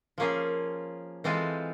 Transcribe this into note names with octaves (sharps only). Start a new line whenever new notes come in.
F3 A#3 C#4 F4 G#4
E3 G#3 C4 F4 A4